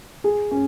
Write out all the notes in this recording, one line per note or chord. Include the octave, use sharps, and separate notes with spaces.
G#4
C#4